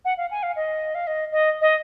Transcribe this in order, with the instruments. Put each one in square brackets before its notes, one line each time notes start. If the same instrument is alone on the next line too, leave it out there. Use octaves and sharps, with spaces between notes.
[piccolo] F#5
F5
G#5
F5
D#5
F5
D#5
D#5
D#5